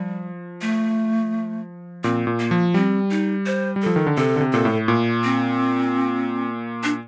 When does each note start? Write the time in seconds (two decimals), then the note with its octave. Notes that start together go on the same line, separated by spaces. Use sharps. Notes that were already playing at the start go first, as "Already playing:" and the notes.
Already playing: F3 G3
0.61 A3
2.04 A#2 C4
2.27 A#2
2.40 A#3
2.51 F3
2.74 G3 C4
3.10 D#4
3.46 C5
3.76 G3
3.82 F3 A4
3.96 D#3
4.07 D3
4.17 C3 A4
4.36 D3
4.41 C3
4.53 A#2 A4
4.65 A2
4.88 A#2
5.24 C4
6.83 D4